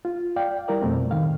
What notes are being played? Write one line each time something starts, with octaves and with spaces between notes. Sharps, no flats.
F4
D5 F5 G5
G3 E4 A#4 D5
F2 B2 A3 C4
A2 D#3 F5